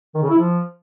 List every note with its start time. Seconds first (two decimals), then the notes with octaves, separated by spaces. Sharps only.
0.15 D#3
0.22 C#3
0.30 E4
0.38 F3